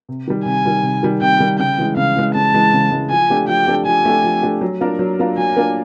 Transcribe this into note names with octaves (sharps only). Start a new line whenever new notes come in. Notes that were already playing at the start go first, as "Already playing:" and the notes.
C3
D#3 G3
C3 G#5
D#3 G3
C3
D#3 G3
C3 G5
D#3 G3
C#3 G5
E3 G#3
C#3 F5
E3 G#3
C#3 A5
E3 G#3
C#3
E3 G#3
F3 G#5
A3 D4 G4
F3 G5
A3 D4 G4
F3 G#5
A3 D4 G4
F3
A3 D4 G4
F#3
A#3 D4 F4 A#4
F#3
A#3 D4 F4 A#4
F#3 G#5
A#3 D4 F4 A#4